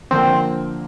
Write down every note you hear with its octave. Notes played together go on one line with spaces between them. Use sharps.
D3 F3 A#3 C4 D4 F4